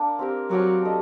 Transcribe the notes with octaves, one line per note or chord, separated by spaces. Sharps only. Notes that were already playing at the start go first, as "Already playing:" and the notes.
Already playing: A#3 D4
C4 G4 A#4
F#3 C4 G4 A#4
D4 A4 D#5